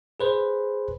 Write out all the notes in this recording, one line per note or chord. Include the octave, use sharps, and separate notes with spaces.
G#4 B4 C5